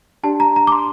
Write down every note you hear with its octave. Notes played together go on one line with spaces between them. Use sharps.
D4 G4 D5 A5
A#5
A#5
D6
C6